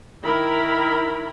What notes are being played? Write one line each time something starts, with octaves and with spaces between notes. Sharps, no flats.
D#3 E4 A#4 B5